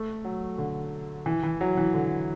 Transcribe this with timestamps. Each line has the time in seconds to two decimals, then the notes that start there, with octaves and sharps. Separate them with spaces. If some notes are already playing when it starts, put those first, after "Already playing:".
Already playing: A3
0.25 F#3
0.58 D3
1.26 E3
1.43 E3
1.61 F#3
1.77 E3
1.94 D3